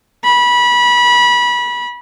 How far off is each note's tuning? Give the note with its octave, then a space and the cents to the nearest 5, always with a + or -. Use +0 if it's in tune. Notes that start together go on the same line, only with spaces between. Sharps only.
B5 -25